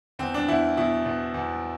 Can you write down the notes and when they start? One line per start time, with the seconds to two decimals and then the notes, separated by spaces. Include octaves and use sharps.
0.19 E2 C4
0.34 D4
0.48 E2 E4
0.77 B2 E4
1.05 B2
1.34 E2